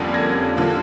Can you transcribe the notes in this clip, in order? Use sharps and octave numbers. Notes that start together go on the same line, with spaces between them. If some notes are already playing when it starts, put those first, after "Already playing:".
Already playing: F2 D3 G3 A#3 C#4
G#6 A#6
D3 F3 A#3